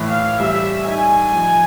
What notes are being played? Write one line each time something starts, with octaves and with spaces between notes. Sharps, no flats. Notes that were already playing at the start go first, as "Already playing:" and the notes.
Already playing: A2 E3
F5
G3 E5
D#4 G#5
F3